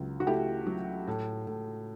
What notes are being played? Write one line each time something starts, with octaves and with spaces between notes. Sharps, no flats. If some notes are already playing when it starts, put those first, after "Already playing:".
Already playing: C#2 F#3
F#4
A3 E4 G4
F#3
A2
A2